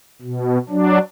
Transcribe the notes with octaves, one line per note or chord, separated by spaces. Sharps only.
B2
F#3 D4